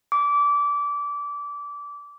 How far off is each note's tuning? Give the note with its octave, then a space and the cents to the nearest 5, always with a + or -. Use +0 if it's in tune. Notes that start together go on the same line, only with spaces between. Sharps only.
D6 -25